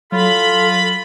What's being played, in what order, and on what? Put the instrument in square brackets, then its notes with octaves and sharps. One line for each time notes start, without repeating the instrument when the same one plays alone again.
[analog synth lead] F#3 [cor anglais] F4 [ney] A4 [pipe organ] B5